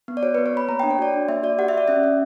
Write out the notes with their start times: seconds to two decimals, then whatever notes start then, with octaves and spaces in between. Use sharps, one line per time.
0.08 B3
0.17 D5
0.23 F#4 C#5
0.35 B4
0.38 B3
0.46 C#5
0.53 B3 B5
0.69 A#3 A#5
0.80 G5
0.83 D4
0.90 C#5
0.99 F#4 D5
1.14 D4
1.29 A#3 E5
1.43 F#4 D5
1.58 G4 F#5
1.68 E5
1.73 G4 D5
1.88 C#4 E5
2.04 C#4